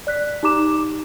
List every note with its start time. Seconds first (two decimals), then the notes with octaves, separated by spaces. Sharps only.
0.07 D5 F#6 B6
0.43 D#4 G4 A#5 D6 E7